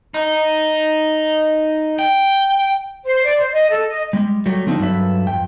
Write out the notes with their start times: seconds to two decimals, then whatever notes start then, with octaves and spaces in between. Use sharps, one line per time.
0.14 D#4
1.99 G5
3.05 C5
3.24 D5
3.37 C5
3.53 D#5
3.69 A4
3.88 D#5
4.13 G3 G#3
4.46 F#3 G3 A3
4.66 D3 F3 C4 D4 D#4
4.80 G2 F#3 A4 B4 E5
5.27 F2 G5